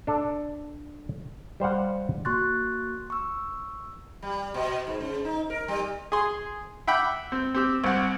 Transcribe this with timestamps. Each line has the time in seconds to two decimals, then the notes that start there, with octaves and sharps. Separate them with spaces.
0.07 D4 A4
1.60 G3 C5 F5 F#5
2.25 A#3 F#4 C6 C#6 F#6 A6
3.10 C#6 E6
4.22 G3
4.54 B2
4.87 G#2
5.00 C#3
5.25 D#4
5.50 A#4
5.68 G3
6.12 G#4 C6
6.87 E5 F#5 G5 B5 D6
7.32 C4
7.54 C4 G4 E6
7.84 C2 C4 F#5